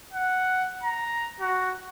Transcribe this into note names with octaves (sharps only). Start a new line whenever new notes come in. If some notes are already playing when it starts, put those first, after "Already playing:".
F#5
A#5
F#4